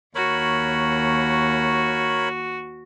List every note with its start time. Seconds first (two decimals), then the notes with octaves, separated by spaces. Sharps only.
0.15 D#2 F#4 A#4 C#5 B5